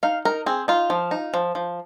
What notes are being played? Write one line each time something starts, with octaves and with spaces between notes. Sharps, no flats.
D#4 F5
D#4 A#4
C4 G#4
D#4 F4
F3
D#4
F3
F3